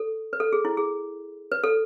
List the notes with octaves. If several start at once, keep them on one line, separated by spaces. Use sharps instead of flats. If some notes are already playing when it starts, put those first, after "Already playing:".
Already playing: A4
B4
A4
G#4
E4
G#4
B4
A4